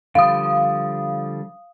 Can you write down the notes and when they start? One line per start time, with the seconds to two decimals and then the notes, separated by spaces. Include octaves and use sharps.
0.15 D3 F3 G3 F5 D#6